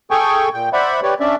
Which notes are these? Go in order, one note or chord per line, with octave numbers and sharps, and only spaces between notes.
G#4 A4 G5 G#5 C#6
A#2 G5
C5 D5 E5 F#5 B5
G4 B4 C#5 D5
C#4 D4 D5 E5